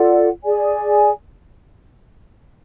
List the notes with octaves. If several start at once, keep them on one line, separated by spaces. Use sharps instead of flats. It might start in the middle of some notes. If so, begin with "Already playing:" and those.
Already playing: F4 A4 D5 F#5
G#4 D5 G#5